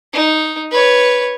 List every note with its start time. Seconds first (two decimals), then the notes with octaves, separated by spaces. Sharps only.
0.13 D#4
0.71 B4 C#5